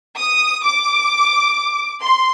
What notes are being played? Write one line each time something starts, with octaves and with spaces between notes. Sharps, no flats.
D#6
D6
C6